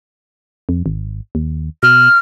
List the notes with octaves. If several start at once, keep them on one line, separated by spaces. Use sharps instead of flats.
F2
G#1
D#2
B2 F6